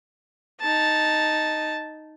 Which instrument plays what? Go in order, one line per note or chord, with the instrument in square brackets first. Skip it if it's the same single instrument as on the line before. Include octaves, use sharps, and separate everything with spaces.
[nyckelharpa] D#4 A5